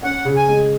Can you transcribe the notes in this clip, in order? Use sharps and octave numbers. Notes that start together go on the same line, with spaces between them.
C#4 F#5
C#3
G#5
G#3